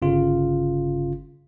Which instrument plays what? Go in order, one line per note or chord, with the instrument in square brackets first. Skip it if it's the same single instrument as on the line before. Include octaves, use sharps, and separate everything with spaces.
[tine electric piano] G1 C#3 F4